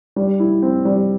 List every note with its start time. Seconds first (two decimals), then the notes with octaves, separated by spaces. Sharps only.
0.16 G3
0.39 E4
0.62 C4
0.85 G3